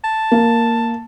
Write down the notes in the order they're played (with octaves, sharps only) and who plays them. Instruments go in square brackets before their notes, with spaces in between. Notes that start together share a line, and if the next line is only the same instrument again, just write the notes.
[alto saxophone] A5
[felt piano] A#3